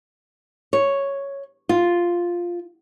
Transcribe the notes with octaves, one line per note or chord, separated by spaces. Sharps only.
C#5
F4